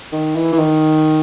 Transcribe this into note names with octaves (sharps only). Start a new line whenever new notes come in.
D#3
E3
E3
D#3